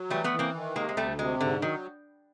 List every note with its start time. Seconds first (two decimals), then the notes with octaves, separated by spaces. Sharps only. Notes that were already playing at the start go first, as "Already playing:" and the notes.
Already playing: F#3
0.10 E3 G3 A3
0.24 A3 B3
0.32 E3
0.39 A#3 C4
0.54 D#3
0.76 C3 G#3 A#3
0.89 G#3
0.97 D2 G3 A3
1.18 C3 G#3
1.40 G#2 D3
1.62 D#3 F#3